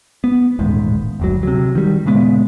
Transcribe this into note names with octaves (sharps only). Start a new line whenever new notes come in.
B3
D#1 A1 G#2
F#1 D2 F#3
C3 F#3
D#3 G3
A#2 C#3 G#3 B3